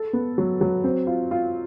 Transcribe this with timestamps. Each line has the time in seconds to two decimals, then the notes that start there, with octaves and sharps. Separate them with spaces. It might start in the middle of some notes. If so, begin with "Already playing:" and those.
Already playing: A4
0.13 B3
0.38 F#3
0.61 F#3
0.84 C4
1.07 F4
1.31 F4